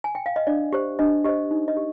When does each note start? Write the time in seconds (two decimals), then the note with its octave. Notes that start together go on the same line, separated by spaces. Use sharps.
0.04 G#5
0.15 G5
0.26 F5
0.36 D#5
0.47 D4 D5
0.73 G4 C5
0.99 D4 D#5
1.25 G4 C5 D#5
1.51 D#4
1.68 D#5
1.77 G4